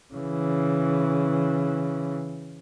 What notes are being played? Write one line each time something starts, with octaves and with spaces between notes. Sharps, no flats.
C#3 E3